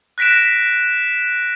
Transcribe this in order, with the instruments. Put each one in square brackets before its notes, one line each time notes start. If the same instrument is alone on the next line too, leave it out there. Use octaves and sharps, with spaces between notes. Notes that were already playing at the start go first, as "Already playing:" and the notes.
[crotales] F#6 A#6 B6 D7 E7